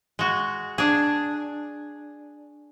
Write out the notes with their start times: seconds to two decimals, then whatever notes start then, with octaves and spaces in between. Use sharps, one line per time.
0.19 G#3 F#4
0.78 D4 G#4